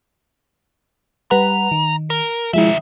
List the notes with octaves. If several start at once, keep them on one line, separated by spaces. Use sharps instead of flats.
G3 B4 F#5 A#5
D#3
A#4
D#3 F3 G#3 E4 E5